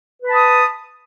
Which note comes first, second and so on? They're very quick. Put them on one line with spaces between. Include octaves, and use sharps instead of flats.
B4 B5 A5 D#6